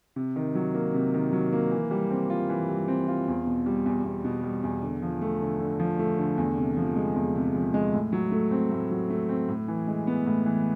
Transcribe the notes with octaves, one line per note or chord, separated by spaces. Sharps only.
C3
D#3
F#3
A#3
C3
D#3
F#3
A#3
E3
G3
C4
F4
E3
G3
C4
F4
E2
B2
G3
E2
E2
B2
G3
E2
D3
F3
A3
D3
D3
F3
A3
D3
E2
C3
F3
G#3
E2
C3
F3
G#3
A2
F#3
A3
C4
A2
F#3
A3
C4
A2
E3
G#3
B3
A2
E3